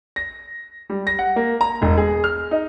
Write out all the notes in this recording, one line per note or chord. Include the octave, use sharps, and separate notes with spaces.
A#6
G3
A#6
F#5
A#3
A#5
E1
G#4
F6
D#4